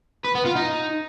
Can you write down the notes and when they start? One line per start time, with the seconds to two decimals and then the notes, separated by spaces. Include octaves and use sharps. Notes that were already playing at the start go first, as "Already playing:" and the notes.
0.25 B4
0.35 B3
0.45 F4
0.56 D#4